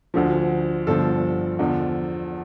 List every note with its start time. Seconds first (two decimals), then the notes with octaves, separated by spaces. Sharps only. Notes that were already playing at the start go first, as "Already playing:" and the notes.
0.14 D2 D3 F3
0.87 G1 G2 D3 F3 A4
1.59 E2 D3 F3